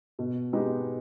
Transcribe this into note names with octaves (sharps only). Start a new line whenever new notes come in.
B2
G#3 B3 D#4 G4